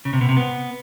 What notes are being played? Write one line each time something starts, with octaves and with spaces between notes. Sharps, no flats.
C#3
C3
B2
C3
B3